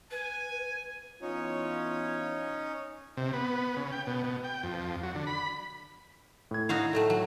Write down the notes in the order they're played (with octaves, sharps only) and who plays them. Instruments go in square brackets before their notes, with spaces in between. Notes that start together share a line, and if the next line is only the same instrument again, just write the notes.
[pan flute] B4 [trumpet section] G#5
[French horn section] E3 B3 F4 [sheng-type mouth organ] C#4 D#4 C#5
[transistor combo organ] C3
B3
C#3
G5
B2
B2
G5
F2
F#3
D3
B5
[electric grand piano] A2 G#6
[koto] D#4 F#4 F5 [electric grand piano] E4
[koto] A2 F#3 A3
F#3